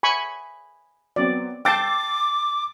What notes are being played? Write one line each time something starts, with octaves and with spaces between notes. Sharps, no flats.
G#5 B5 C#6
F#3 B3 C4 D5
G5 A5 D6 E6 A6 C7